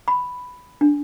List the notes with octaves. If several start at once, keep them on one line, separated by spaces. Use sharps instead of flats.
B5
D4